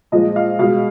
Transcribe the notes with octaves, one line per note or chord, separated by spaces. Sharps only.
A#2 F3 G#3 D#5
F5
B2 G#3 F5